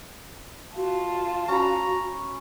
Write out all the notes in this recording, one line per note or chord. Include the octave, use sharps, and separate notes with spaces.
F4 F#4 A5
C#4 F#4 A#5 B5